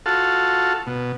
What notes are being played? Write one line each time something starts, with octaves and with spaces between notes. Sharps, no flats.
F4 F#4 A4
B2